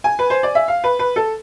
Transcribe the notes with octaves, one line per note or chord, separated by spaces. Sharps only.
G#5
B4
C5
D5
E5
F5
B4
B4
A4